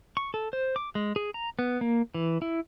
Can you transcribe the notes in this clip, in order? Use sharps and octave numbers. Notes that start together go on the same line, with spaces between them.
C#6
A4
C5
D6
G#3
G#4
A#5
B3
A#3
E3
E4